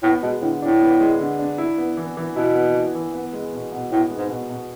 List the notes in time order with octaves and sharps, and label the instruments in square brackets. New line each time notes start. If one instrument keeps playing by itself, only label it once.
[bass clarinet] A2 [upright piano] B3
[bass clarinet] B2 [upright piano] G#3
[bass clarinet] A2 [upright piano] D3
[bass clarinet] A2 [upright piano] D4
[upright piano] B3
G#3
D3
D4
E4
B3
E3
E3
[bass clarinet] B2 [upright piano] E4
[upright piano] B3
E3
E3
B3
G#3
B2
B2
[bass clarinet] A2 [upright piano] B3
[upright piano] G#3
[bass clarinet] G#2
[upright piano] B2
B2